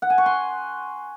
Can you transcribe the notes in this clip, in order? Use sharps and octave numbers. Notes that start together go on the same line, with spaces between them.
F#5
G#5
C#6
C6